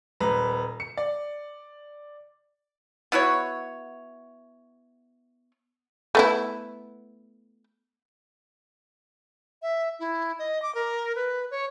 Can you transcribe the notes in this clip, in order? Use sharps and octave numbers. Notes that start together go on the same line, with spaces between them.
D#1 B4 A#5
C#7
D5
B3 E4 F#4 C#5
A3 B3 E4
E5
E4
D#5
D6
A#4
B4
C#5